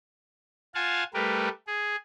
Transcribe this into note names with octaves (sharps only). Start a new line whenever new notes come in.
F4 F5 F#5 G#5 A5
G3 A3 G4 A#4 B4
G#4